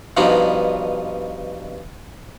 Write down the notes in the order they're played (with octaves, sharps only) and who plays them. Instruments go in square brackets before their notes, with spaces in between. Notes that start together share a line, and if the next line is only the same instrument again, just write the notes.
[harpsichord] G2 B2 F3 D4 D#4